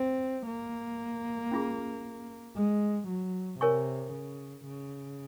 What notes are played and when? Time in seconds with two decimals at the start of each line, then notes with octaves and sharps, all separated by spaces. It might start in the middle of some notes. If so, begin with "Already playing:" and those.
Already playing: C4
0.47 A#3
1.52 C#4 F4 G#4
2.55 G#3
3.08 F#3
3.60 C3 A#4 C#5 G#5 C#6
4.13 C#3
4.66 C#3